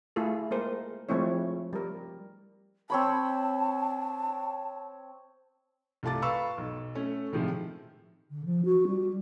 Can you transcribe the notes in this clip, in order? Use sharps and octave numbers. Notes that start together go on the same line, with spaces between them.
A3 E4 F4 G#4 A4
G#3 A#3 A#4 C5
F3 G#3 A3 C4 E4 C#5
G3 A#4
C4 C#5 A5 B5
C2 A3 F4 A5 D6 A6
B4 F5 B5 C#6 E6
B1
A3 C#4
A2 C3 D#3 F3 G#3
D3
F3
F#4
G3